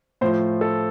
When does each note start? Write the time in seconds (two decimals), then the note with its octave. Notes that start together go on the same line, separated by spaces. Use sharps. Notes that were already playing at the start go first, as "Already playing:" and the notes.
0.21 A2 F3 C5
0.61 A4